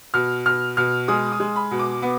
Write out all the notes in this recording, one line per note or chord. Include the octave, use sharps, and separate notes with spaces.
B2 F6
B2 F6
B2 F6
G#3 D#6
D#6
G#3
B5
B2
D6
B3